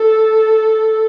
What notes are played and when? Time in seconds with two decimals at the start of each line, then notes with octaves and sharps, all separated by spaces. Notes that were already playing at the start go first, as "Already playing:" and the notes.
Already playing: A4